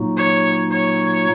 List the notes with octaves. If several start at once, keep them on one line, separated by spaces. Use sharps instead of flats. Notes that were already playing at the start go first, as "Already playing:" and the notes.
Already playing: A#2 F#3 A#3 D#4 F#4
C#5
C#5